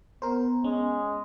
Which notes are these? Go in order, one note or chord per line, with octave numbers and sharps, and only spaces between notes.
B3 A#4 C5
G#3 C#4